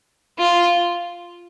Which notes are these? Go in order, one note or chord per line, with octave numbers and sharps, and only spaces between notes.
F4